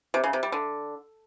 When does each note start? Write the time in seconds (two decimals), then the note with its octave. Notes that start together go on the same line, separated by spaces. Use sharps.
0.14 C3
0.24 C#3
0.33 C3
0.43 G3
0.52 D3